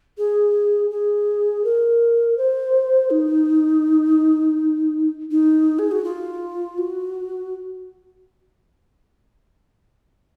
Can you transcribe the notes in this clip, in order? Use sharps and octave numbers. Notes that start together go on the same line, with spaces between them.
G#4
G#4
A#4
C5
D#4
D#4
G#4
F#4
F4
F#4